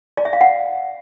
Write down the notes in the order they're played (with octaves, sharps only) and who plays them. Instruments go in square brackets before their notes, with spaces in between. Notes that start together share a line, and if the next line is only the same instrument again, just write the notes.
[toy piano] D5
E5
F5
F#5